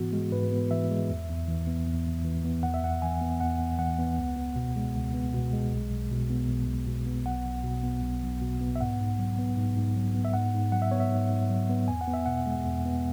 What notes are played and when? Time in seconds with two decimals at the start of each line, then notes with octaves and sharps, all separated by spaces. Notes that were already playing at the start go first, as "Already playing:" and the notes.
Already playing: G#2 E3 B3 F#4
0.13 G#3
0.32 G#2 B4
0.52 B3
0.71 E3 E5
0.91 G#3
1.10 E2
1.29 E2
1.48 E3
1.67 B3
1.86 E2
2.06 E2
2.24 E3
2.44 B3
2.63 E2 F#5
2.74 E5
2.83 E2 F#5
3.02 E3 G#5
3.21 B3
3.40 E2 F#5
3.60 E2
3.79 E3 F#5
3.98 B3
4.18 C#2
4.36 B3
4.56 B2
4.76 G#3
4.95 C#2
5.14 B3
5.33 B2
5.53 G#3
5.72 B1
5.90 B1
6.11 B2
6.30 B3
6.48 B1
6.68 B1
6.87 B2
7.06 B3
7.26 B1 F#5
7.45 B1
7.64 B2
7.83 B3
8.02 B1
8.22 B1
8.42 B2
8.61 B3
8.76 E5
8.81 G#2 F#5
9.00 G#2
9.19 F#3
9.39 B3
9.57 G#2
9.76 G#2
9.96 F#3
10.15 B3
10.25 E5
10.34 G#2 F#5
10.54 G#2
10.72 F#3 F#5
10.82 E5
10.91 B3 C#5
11.00 E5
11.11 G#2
11.30 G#2
11.50 F#3
11.69 B3
11.88 E2 G#5
12.01 F#5
12.07 B3
12.14 E5
12.26 B2 F#5
12.46 G#3
12.65 E2
12.85 B3